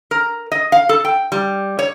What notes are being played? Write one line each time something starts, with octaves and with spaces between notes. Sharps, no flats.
A#4
D#5
F5
A4
G5
G3
C#5